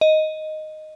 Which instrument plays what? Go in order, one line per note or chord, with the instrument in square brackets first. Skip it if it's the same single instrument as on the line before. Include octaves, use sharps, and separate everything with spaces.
[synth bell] D#5